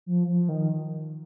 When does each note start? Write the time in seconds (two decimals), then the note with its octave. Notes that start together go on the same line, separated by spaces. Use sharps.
0.06 F3
0.27 F3
0.49 D#3